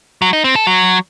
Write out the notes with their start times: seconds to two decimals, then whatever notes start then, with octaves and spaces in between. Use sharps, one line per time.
0.22 F#3
0.33 D#4
0.44 C4
0.56 A4
0.67 F#3